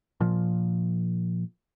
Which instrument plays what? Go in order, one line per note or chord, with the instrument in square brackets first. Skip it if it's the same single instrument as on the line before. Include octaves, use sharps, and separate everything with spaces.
[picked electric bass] A#2 F3